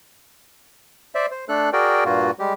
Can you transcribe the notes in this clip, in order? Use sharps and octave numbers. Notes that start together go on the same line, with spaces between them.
C5 D5 E5
C5
A3 D4 A4 F#6
F#4 G#4 A#4 D5 G5
G2 A#2 A#3 F4 F#4
G3 G#3 G4